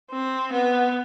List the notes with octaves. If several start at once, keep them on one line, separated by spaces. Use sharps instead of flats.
C4
B3